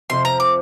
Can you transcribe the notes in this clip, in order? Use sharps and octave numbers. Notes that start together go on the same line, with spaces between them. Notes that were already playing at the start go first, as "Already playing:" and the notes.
F2 C3 F3 C6
A#5
D6